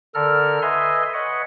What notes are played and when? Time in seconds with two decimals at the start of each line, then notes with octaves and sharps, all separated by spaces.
0.15 D3 A4 A#4 F6
0.62 B4 D#5 E5 G#5 C6
1.14 B4 C#5 D#5 F#5